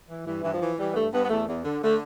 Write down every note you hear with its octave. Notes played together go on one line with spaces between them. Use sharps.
E3
G2 E3
G2 E3
F3
E3
E3 G3
B3
G2 A3
G2 B3
B3
E2 A3
E2
D3
D3 A3